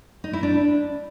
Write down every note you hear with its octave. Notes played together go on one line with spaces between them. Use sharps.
D#4
E4
D4